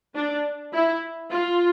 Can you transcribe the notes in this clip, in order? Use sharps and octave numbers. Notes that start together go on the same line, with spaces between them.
D4
E4
F4